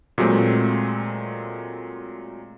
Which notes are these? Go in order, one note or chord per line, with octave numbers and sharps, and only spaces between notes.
A#2 F#3 G#3 A3 C4